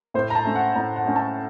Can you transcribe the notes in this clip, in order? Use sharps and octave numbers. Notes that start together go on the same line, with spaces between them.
A2 C5
A#5
A5
A3 C#4
F#5
A2 A#5
F#5
A3 C#4
A5